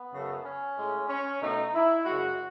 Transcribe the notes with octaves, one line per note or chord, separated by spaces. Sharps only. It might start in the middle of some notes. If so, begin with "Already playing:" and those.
Already playing: B3
F#2 C#3 F#3 A3
C#4
A2 G#3
C#4
B2 A3 D#4
E4
F#2 C#3 G#3 F#4